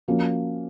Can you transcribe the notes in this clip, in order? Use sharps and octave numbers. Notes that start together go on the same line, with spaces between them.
F3 A#3 C#4 F#4